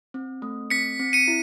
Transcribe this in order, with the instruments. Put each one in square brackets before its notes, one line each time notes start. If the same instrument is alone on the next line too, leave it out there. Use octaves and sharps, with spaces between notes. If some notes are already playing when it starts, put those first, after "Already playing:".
[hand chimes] C4
A3
[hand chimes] C4 [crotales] B6 C#7
[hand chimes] C4
[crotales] C#7 D#7
[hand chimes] E4